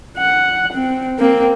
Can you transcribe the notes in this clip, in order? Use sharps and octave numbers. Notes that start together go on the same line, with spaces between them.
F#5
C4
A#3 C4